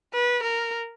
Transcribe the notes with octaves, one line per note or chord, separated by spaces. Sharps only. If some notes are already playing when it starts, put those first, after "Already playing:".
B4
A#4